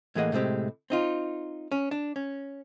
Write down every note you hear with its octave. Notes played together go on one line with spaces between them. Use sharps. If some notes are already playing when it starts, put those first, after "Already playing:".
A2 E3 A#3 G#4 D#5 F#5
A2 C3 G#3 C4 G4
C4 D#4 F4
C#4
D4
C#4